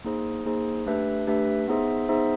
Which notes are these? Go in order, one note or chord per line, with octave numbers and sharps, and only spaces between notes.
A#3 D#4 G#4 C5
A#3 D#4 G#4 C5
A3 D4 G4 B4 E5
A3 D4 G4 B4 E5
B3 D#4 G#4 C5 E5
B3 D#4 G#4 C5 E5